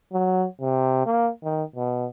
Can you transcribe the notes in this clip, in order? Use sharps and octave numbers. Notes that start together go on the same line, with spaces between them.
F#3
C3
A#3
D#3
B2